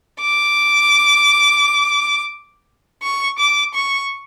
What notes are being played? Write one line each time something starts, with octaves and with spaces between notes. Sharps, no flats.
D6
C#6
D6
C#6